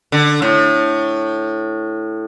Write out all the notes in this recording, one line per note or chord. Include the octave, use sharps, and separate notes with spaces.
D3
A2